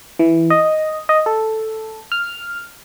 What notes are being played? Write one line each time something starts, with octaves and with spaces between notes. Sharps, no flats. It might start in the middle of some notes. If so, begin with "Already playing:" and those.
E3
D#5
D#5
A4
F6